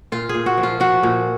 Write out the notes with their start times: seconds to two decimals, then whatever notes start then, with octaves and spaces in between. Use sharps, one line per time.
0.12 A#2 F4
0.29 G#4
0.34 A#2
0.46 F#4
0.58 F3
0.63 F4
0.80 F3 F#4
1.03 A#2